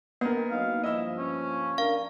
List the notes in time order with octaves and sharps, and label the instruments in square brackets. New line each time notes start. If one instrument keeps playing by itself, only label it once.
[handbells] A#3 D4 [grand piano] B3 A#4
[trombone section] F#3 D#4 [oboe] F5
[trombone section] G2 F3 [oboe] E4 [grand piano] D#5 E6
[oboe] C#4
[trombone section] D4 A#4 [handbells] F5